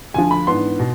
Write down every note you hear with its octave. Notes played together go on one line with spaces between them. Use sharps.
D2 D3 F3 G#5
B5
G#2 E3 B3 D4 C6
B2